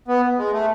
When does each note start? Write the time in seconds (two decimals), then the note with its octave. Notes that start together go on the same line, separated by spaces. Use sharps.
0.08 B3
0.38 G#3
0.53 A3